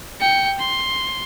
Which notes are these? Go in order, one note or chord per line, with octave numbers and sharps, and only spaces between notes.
G5 C#7
C6